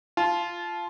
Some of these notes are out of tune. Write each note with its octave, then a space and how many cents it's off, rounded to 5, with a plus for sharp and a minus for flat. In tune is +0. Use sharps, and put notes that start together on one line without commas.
F4 -10 A5 -25